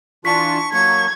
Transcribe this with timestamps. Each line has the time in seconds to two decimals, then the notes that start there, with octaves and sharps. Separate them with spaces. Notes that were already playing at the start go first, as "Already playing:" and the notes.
0.25 E3 D4 F4 A5 C#6 B6
0.73 F#3 A#3 C#6 G#6